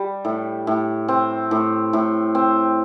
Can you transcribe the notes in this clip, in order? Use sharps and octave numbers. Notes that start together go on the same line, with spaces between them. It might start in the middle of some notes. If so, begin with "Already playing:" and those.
Already playing: G3
A2
A2
C4
A2
A2
C4